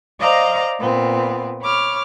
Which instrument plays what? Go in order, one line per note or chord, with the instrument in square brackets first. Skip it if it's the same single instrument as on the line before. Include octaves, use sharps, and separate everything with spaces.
[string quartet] C5 D5 D#5 F5 A#5
A#2 B3 C4
C#5 B5 D6 F6